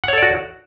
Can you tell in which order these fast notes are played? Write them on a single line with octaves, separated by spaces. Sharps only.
F#5 C#5 A4 D5 F#4